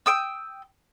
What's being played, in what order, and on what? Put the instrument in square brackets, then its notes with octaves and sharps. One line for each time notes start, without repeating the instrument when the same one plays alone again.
[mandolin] G5 D#6 E6